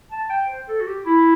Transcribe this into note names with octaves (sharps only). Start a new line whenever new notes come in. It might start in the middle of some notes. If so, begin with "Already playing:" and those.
A5
G5
C5
A4
F#4
G4
E4